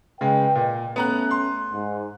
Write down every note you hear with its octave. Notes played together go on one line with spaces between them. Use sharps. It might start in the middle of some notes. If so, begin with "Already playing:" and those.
C#3 G#3 B4 D#5 G5
A#2
A3 B3 C#4 A#5 F#6
C6
G#2